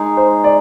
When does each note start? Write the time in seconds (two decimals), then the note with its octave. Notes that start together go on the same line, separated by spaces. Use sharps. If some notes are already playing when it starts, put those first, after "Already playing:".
Already playing: G#3 D#4 G#4
0.17 C5
0.44 D5